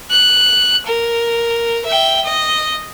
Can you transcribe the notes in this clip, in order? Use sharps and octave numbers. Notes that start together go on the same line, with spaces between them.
F#6
A#4
E5 G5
D#5